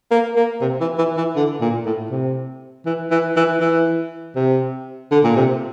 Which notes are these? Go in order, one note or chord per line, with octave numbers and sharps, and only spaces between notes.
A#3
A#3
C3
E3
E3
E3
D3
A#2
A2
C3
E3
E3
E3
E3
C3
D3
A#2
C3